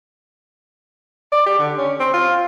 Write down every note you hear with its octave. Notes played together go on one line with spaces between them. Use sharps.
D5
G4
D3
C#4
C4
F4